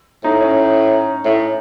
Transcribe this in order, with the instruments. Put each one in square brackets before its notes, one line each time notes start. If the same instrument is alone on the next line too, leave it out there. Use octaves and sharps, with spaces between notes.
[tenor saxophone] A2 [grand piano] D#4
[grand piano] C#4
[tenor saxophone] A2